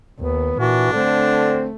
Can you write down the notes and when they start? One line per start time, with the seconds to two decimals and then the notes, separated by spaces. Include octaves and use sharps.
0.20 D#2 B3
0.59 A#2 E3 D4 F#4
0.93 D3 A3 C4